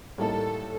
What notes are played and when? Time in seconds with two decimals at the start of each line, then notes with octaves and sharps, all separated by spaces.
0.18 A2 G3 A#3 D#4 A4